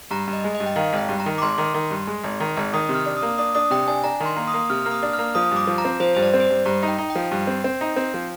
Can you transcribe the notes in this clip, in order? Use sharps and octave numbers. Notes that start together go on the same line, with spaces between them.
G2 A#5
G2
D#5
G#3
D#5
G2
G5
D#3 F5
G#1 G5
G2
A#5
D#3
D6
G#1 C6
D#3
D#3
G2
G#3
G#1
D#3
G#1
D#3 D#6
C3
F6
D4
D#6
A#3
D4 D#6
D4 D#6
C3 G5
D4 G#5
D4 A#5
D#3
C6
A#3
D#6
A#3
C3 F6
A#3 F6
D#6
D4
A#3 F6
F3 D#6
G2
D6
F3
A#5
C4
F3 C5
G2 C5
D5
C4
C5
D5
G2
G2 A#5
D#4
G5
D#4
G5
F3
G2
C4
C4
D#4
C4
F3